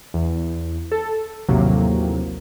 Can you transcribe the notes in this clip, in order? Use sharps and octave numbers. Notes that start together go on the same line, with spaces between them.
E2
A4
A#1 D#2 A2 C3 F#3 A#3